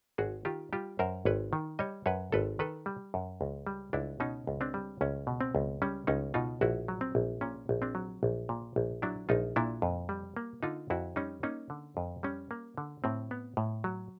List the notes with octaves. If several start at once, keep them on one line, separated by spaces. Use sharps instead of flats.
G#1 F#4 G#4
D#3 F4 G4
G3 F4 G4
F#2 A#4 C5
G#1 B4 C#5
D#3
G3 C#5 D#5
F#2 B4 C#5
G#1 A4 B4
D#3 A4 B4
G3
F#2
C#2
G3
C#2 D4 E4
B2 C#4 D#4
C#2
C4 D4
G3
C#2 C#4
B2
C4
C#2
G3 C#4
C#2 C#4 D#4
B2 D#4 F4
A#1 E4 F#4
F#3
C4
A#1
A#2 C#4
A#1
C4 D4
F#3
A#1
A#2
A#1
F#3 D4 E4
A#1 D#4 F4
A#2 D4 E4
F2
G3
A#3
D3 D#4 F4
F2 E4 F#4
G3 C#4 D#4
A#3 C#4 D#4
D3
F2
G3 C#4
A#3
D3
A2 C4
B3
A2
F#3